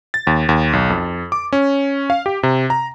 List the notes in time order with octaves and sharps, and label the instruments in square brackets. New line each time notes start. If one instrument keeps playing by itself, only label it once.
[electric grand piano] A6
D#2
D#2
B1
F2
D6
C#4
F5
G4
C3
A#5